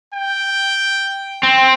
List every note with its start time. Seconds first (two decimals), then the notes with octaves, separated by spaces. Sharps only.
0.14 G5
1.43 C4